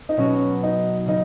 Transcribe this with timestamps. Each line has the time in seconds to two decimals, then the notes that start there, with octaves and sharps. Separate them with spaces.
0.09 D#4
0.17 B2 F#3 B3 C#4 F#4 B4
0.63 D#4
1.06 C#3 F#3 D#4